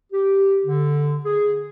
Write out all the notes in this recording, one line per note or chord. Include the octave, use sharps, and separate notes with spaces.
G4
D3
G#4